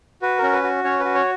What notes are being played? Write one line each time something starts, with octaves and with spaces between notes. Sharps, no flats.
F#4 B4
C#4 A#4
B4
F#4
C#4 C#5
F#4 B4
C#5